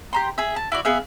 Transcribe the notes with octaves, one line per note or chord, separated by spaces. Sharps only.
G4 A#5 C6
G#4 E5
A5
E4 F#4 D5
B3 G#4 E5 F5